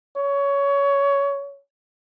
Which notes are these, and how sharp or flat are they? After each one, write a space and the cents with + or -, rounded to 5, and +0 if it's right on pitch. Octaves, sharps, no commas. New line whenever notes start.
C#5 +20